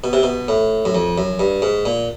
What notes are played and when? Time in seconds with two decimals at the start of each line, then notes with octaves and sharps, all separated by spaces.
0.04 B2
0.13 C3
0.23 B2
0.48 A2
0.85 F#2
0.95 F2
1.18 F#2
1.40 G2
1.62 G#2
1.85 A#2